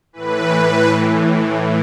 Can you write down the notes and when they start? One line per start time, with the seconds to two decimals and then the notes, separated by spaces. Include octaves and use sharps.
0.13 A2 E3 B4
0.50 B4
0.88 A2 E3